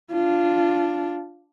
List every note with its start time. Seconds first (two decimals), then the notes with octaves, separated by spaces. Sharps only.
0.12 D4 F4